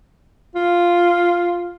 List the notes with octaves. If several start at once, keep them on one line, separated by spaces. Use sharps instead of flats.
F4